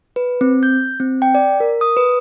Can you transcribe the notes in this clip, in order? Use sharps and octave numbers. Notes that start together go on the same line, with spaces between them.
B4
C4
G6
C4
G5
D5
A#4
D#6
B4